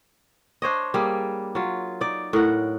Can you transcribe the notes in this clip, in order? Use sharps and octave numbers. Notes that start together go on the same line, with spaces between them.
D4 C5 C#5 D#5
G3 A#3 G#4
F#3 F4
D#4 D5
A2 A#4 F#5